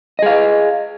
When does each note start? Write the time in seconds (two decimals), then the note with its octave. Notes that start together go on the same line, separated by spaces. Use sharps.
0.19 D#5
0.22 G#4
0.26 F5